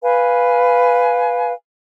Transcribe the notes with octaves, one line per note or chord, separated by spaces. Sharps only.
B4 F5 G#5